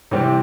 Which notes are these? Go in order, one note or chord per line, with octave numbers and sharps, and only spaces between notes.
C3 E3 G3 C4 G4